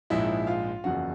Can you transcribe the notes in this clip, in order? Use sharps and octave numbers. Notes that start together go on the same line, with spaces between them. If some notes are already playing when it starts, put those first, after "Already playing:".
A#1 G#2 F3 G#3 E4 E5
F4 F5
F#1 E2 C#3 F3 F#4 F#5